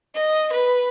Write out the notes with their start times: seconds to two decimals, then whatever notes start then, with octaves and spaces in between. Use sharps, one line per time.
0.15 D#5
0.52 B4